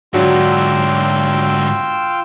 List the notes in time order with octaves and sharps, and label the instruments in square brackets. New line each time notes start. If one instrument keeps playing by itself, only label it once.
[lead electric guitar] G#2 D3 [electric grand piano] F#3 D4 F#4 [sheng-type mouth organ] F4 G5 E6